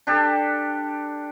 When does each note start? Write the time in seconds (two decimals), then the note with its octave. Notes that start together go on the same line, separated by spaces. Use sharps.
0.07 D4 G4 A4